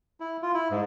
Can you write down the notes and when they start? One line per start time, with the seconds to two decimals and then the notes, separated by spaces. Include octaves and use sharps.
0.20 E4
0.42 F4
0.54 E4
0.71 G#2